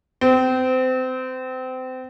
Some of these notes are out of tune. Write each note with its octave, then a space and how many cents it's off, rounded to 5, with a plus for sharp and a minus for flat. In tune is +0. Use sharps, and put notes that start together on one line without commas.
C4 -25